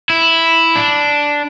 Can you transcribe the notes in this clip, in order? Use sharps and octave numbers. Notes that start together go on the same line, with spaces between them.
E4
D4